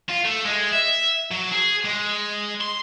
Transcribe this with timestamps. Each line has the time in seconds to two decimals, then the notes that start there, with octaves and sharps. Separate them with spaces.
0.09 F4
0.25 A3
0.46 G#3
0.72 E5
1.31 F#3
1.52 G#4
1.85 G#3
2.61 C6